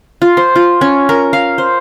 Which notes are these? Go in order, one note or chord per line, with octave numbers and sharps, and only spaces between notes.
F4
C5
F4
C#4
A#4
F5
C5